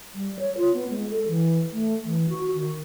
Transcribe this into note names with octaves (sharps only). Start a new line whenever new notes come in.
G3
C#5
F4
B3
G#3
A4
E3
A3
E3
F#4
D#3